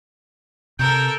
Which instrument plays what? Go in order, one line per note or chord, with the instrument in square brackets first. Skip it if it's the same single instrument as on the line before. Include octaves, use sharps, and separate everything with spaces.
[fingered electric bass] C3 [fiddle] A4 A#4 [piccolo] G6